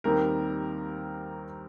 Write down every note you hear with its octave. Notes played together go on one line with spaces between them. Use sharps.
D#2 D#3 G3 C4 D#4 A#4